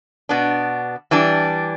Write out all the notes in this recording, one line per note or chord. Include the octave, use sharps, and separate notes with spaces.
B2 B3 D4
E3 G3 D4